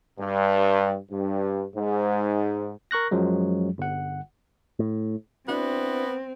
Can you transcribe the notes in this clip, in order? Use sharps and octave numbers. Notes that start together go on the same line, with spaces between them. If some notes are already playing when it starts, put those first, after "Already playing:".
G2
G2
G#2
A#4 C#6 F#6 A#6
F#2 F3 F#3 G#3
G1 F#5
A2
B3 C4 D4 E4 F#4